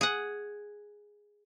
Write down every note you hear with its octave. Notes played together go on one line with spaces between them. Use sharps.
G#4 F#5